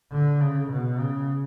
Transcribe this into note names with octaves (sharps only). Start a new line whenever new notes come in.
D3
C#3
B2
C#3